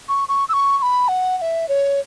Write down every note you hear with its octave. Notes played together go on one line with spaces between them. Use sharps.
C#6
C#6
E6
C#6
C#6
B5
F#5
F#5
E5
C#5